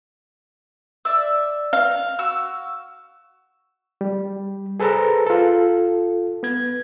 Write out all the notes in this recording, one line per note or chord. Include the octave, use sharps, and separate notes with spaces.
D5 E5 E6
F5
F#4 E6
G3
G#4 A4 B4 C5 A5 A#5
F4 A4
B3 G#6